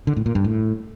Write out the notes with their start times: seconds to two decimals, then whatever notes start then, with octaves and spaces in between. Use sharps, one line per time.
0.07 D3
0.16 A2
0.26 A#2
0.35 G2
0.44 A2